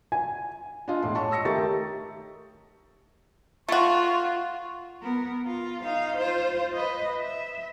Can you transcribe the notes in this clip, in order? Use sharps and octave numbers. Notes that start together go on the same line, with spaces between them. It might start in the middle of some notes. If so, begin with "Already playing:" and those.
G#5
D4 F4 D#5
E1 A2 C6
C#5 D#5 A5 C#6
D#6 E6 A#6 C#7
D#3 A3 G4 A#5 C#6 A6
A3 F4 F#4 C#6
B3 A#4
F4
D#4 F5
F4 C5
B4 D#5
E5